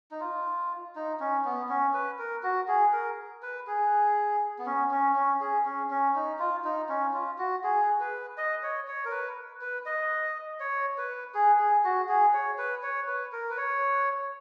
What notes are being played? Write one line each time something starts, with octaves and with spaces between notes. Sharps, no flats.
D#4
F4
D#4
C#4
B3
C#4
B4
A#4
F#4
G#4
A#4
B4
G#4
B3
C#4
C#4
C#4
G#4
C#4
C#4
D#4
F4
D#4
C#4
F4
F#4
G#4
B4
D#5
C#5
C#5
A#4
B4
B4
D#5
C#5
B4
G#4
G#4
F#4
G#4
C#5
B4
C#5
B4
A#4
B4
C#5